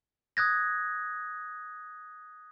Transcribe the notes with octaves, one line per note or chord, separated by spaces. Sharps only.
D#6 F#6 G#6 A#6